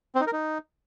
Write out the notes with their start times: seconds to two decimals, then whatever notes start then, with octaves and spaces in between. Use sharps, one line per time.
0.15 C4
0.21 D#4
0.27 A#4
0.33 D#4